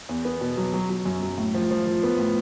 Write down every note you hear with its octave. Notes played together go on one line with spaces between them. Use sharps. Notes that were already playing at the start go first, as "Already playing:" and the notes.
E2
B3
B2
F#3
F#3
F#3
F#2
F#3
A2
F3
F3
F3
B3
A2